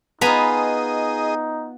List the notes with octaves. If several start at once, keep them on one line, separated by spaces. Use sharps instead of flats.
B3 D#4 F4 G#4 D#5 G#5 A#5 B5